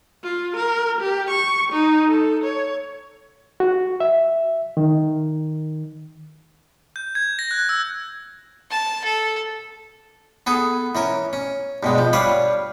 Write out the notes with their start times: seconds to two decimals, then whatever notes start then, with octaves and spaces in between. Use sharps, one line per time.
0.24 F4
0.57 A#4
1.01 G4
1.30 C#6
1.72 D#4
2.08 A4
2.44 C#5
3.60 F#4
4.00 E5
4.77 D#3
6.96 G6
7.15 G#6
7.39 A#6
7.51 F#6
7.69 E6
8.71 A5
9.05 A4
10.47 B3 G#4 A4
10.95 E3 C#4 A#4
11.33 C#4
11.83 G2 B2 G#3
11.98 F3
12.13 G3 D4 B4 C#5 D5 F5